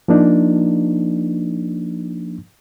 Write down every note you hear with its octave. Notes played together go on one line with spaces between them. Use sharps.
F3 A#3 D4 D#4